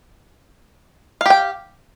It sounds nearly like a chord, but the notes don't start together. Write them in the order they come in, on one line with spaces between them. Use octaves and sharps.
F5 G4 G5